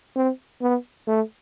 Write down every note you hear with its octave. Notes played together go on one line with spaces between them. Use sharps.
C4
B3
A3